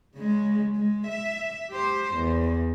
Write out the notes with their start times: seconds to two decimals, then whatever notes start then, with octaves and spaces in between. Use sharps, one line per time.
0.15 C#3 G#3
0.76 G#3
1.08 E5
1.71 G4 C5
2.15 E2